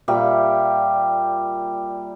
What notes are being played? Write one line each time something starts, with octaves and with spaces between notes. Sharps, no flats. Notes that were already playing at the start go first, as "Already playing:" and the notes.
A#2 G3 G4 E5